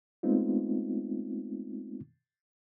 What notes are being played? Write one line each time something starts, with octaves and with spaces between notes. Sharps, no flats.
G#3 A3 B3 C4 D#4 F4